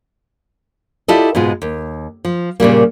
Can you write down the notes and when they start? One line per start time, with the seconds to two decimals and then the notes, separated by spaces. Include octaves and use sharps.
1.08 E4 F4 G4 A4 D5 D#5
1.35 G#2 B2 G#3 F4
1.62 D#2
2.25 F3
2.60 A#2 C#3 G3 A#3